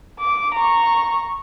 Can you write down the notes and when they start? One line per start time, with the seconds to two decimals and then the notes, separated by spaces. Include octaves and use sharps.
0.19 D6
0.55 A#5 C#6